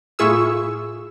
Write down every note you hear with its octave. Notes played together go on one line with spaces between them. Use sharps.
A2 E4 F4 G#4 C#6 E6